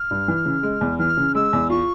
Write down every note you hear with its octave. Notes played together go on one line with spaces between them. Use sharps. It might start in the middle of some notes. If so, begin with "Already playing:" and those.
Already playing: F6
G2
E3
C#3
G#3
E2
E3 F6
C#3
G#3 E6
E2
F4 C#6